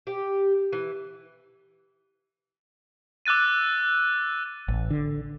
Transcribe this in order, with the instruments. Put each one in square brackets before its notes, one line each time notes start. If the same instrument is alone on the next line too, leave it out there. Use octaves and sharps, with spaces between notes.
[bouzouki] G4
E3
[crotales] D6 E6 F#6 A6 D#7
[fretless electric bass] A1
D3